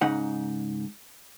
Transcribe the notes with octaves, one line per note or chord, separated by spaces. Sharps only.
G#2 C#3 D#4 F#5